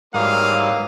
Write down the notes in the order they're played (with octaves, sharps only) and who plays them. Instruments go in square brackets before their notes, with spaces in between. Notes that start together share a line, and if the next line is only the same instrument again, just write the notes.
[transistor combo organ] G#2 G3 D#6 [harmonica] E3 F#3 A#3 [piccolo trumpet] F5